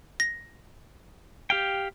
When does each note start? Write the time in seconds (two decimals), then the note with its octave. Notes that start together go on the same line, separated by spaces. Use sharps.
0.20 A#6
1.50 G4 F5 G5